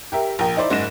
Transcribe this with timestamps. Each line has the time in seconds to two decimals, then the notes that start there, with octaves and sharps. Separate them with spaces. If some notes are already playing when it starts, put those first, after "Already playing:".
0.12 G4 A#4 E5
0.39 A#1 A#4 G5
0.57 D#4 E4 C5 D5
0.70 F#1 G#2 G#3 A#6 E7